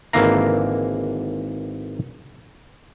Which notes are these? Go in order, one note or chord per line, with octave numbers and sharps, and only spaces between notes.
G#1 D3 E3 A#3 F5 A#5